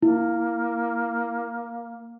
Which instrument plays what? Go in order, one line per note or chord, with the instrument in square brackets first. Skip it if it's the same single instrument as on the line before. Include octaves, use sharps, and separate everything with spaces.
[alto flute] A#3 [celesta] E4